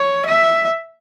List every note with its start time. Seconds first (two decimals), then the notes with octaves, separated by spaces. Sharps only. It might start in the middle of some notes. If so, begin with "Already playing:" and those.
Already playing: C#5
0.26 E5